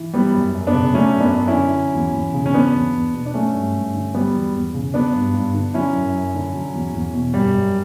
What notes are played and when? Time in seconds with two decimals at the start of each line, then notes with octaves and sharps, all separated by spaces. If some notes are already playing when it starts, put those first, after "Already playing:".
Already playing: E3
0.14 F#3 G3 B3
0.34 F#2
0.55 F#2
0.67 B3 D4
0.74 C#3
0.94 F#3 A3 C#4
1.14 F#2
1.20 B3 D4
1.34 F#2
1.47 C#4 E4
1.54 D3
1.74 F#3
1.95 E2
2.14 E2
2.34 C#3
2.46 C#4
2.54 F#3 B3 D4
2.74 E2
2.95 E2
3.14 B2
3.26 D4
3.34 F#3 A3 C#4
3.54 G2
3.74 G2
3.95 D3
4.15 F#3 G3 B3
4.34 E2
4.55 E2
4.74 C#3
4.94 F#3 B3 D4
5.15 G2
5.34 G2
5.54 D3
5.74 F#3 C#4 E4
5.95 F#2
6.14 F#2
6.34 D3
6.54 F#3
6.74 E2
6.94 E2
7.14 B2
7.34 F#2 G3
7.54 F#2